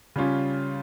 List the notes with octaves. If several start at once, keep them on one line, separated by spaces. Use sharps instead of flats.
C#3 G3 C#4 F4